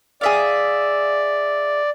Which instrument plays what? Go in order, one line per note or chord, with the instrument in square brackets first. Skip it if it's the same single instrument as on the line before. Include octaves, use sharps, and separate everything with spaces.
[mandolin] G#4 E5 F5 [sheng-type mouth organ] D5